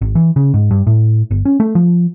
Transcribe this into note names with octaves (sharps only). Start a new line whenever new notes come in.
G#1
E3
C#3
G#2
G2
A2
G1
C#4
A3
F3